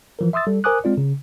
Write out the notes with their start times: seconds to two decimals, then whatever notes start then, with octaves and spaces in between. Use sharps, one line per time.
0.19 E3 F3 A#4
0.33 E5 C6 D#6 E6 A6
0.47 G3 A4
0.64 A#4 C5 G#5 D6 D#6 F#6
0.84 G#3 C4 F4 D5
0.97 C#3